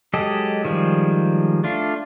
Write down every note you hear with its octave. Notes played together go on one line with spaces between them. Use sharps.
F#3 G#3 G4 A4 D#5
D#3 F3 G3 G#3
A3 D4 F4